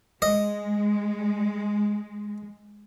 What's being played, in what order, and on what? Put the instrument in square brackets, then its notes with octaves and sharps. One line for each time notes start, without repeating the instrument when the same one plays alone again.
[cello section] G#3 [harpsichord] D#5